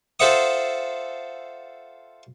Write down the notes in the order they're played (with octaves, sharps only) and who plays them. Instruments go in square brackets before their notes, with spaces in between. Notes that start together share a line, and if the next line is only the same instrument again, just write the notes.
[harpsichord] F4 A4 C5 E5 F#5 D#6